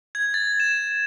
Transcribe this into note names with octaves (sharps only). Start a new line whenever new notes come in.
G#6
A6
E7